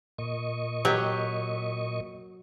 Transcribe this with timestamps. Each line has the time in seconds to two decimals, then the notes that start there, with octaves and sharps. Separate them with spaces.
0.18 A#2 D#5 C#6
0.85 F#3 G4